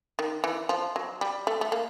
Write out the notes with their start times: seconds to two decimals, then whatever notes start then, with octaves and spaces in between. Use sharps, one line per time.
0.19 D#3
0.44 E3
0.69 F3
0.96 F#3
1.21 G3
1.47 A3
1.61 A3
1.72 A#3